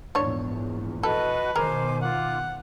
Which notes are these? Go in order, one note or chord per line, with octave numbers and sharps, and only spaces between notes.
A#1 E2 G#2 D4 C#5
F#4 A4 B4 D#5 A5
B2 D#3 G#4 A#4 C5 G#5 D6
F4 F#5 D6